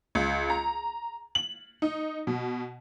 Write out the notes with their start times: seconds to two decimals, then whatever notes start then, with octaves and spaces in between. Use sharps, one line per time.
0.15 C#2
0.49 A#5
1.35 F#7
1.82 D#4
2.27 B2